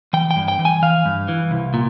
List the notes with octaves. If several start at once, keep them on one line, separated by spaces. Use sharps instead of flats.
E3 G5
G5
G2
G5
E3
G#5
E3 F5
G2
E3
C2
A#2